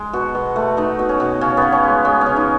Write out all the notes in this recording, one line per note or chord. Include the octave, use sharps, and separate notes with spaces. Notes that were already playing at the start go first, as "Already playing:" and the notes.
Already playing: G#3
B2 F#4
B2
A3
A3 D#4
B2
C#4
B2
C#3 C#4
C#3 B3
C#4
G#3
G#3 B3
C#4
C#3
D#4